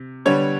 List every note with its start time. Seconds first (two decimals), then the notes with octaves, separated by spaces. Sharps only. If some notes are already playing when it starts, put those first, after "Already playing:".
Already playing: C3
0.26 D3 G3 B3 C#5